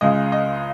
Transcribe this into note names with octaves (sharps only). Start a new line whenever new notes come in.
C#2 C#3 G#3 D#5
D#5